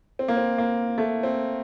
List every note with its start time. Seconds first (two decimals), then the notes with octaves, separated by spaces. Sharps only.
0.19 C4
0.28 A#3
0.37 C4
0.58 A#3
0.98 A3
1.23 C4